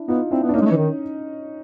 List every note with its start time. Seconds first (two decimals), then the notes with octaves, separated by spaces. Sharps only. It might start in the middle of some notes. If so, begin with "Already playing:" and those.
Already playing: D4 E4
0.08 B3 D#4 F4
0.31 C4 D4 E4
0.43 B3
0.49 D4
0.54 A#3 C#4 D#4
0.62 G#3
0.65 A3
0.71 E3
0.77 D#3